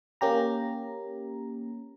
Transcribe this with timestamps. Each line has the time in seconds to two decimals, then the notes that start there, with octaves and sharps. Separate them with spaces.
0.21 A#3 C#4 G4 A#5